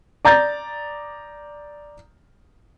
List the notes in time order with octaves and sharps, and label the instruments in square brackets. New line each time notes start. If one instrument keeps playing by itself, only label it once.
[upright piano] D5 A#5 G6 A6